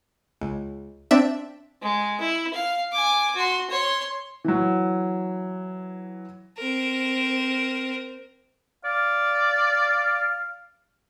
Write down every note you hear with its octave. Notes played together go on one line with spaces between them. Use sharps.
C#2
C4 D4 E5
G#3
E4
F5
G#5 D6
F#4 C6
C#5 C6
E3 F#3
C4 A#4
D5 F5